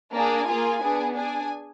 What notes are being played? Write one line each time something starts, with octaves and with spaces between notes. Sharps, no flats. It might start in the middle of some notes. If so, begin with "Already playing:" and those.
A#3 D4 G#4 G#5
A#3 F4 G#4
B3 D4 G#4
D4 G#4 G#5